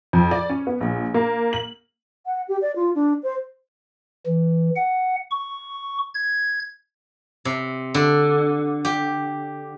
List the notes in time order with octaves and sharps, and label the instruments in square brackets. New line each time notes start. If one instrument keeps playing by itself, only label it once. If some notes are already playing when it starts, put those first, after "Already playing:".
[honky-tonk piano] F2
D5
C#4
B3
A#1
A#3
F#7
[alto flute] F#5
G4
D5
F4
D4
C5
[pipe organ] E3
F#5
C#6
G#6
[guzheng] C3
D3
G4